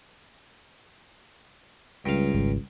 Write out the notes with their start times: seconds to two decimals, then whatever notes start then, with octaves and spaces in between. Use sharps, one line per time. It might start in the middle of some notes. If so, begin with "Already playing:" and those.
2.06 C#2 G2 F5
2.34 G#1